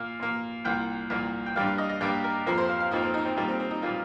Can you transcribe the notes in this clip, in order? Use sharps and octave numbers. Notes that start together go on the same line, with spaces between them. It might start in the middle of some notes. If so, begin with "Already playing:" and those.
Already playing: A#2 A#3 F5
A#2 A#3
C2 A#2 A#3 G5
C2 A#2 A#3
G5
G2 G3 A#3 F5
F5
D#5
D#5
G2 G3 A#3 G4
A#4
F2 F3 A#3 A#4
C5
F5
F5
F2 F3 A#3 D#4
C4
D#4
C4
A#2 G3 A#3 D#4
C4
C4
D#4
A#2 G3 A#3 F4